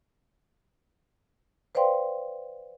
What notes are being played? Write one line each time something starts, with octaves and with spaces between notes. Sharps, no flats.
B4 C5 D5 F5 G5 C6